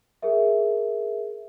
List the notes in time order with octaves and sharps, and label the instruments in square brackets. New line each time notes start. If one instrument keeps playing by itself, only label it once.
[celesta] G#4 A#4 E5